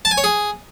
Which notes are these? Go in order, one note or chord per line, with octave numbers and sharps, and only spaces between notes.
A5
G#5
C#5
G#4